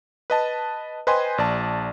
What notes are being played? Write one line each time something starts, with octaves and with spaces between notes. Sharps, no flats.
B4 D#5 A5
B4 C5 D#5 G5 G#5 C6
A#1 D5 A5